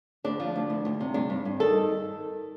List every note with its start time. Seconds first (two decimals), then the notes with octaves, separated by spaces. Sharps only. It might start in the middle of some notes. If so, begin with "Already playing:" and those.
0.24 D2 D4
0.40 F3
0.56 D2
0.70 D2
0.85 D2
1.01 C3
1.14 G2 D4
1.30 G2
1.45 G2
1.60 D#3 A4